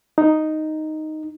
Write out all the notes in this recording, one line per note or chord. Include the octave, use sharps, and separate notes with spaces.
D#4